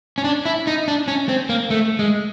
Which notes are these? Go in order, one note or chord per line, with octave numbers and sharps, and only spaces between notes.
C#4
D4
E4
D#4
D4
C#4
C4
A#3
A3
G#3